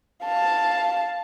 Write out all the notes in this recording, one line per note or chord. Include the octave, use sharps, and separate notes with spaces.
F5 A5